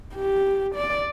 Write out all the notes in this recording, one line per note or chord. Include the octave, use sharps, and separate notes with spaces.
G4
D5